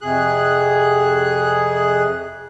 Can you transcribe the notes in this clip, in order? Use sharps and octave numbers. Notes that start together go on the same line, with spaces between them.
F2 C3 G#4 F#6